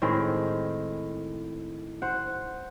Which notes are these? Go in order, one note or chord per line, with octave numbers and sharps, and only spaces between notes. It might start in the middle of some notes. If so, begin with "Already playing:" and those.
A2 D#3 G#3 C4
C5 F#5